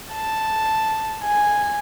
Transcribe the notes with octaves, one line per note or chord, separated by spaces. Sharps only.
A5
G#5